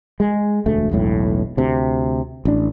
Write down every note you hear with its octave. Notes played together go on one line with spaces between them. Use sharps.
G#3
E1 D2 A3
E1 B1 A2
D2 C3
A1 D4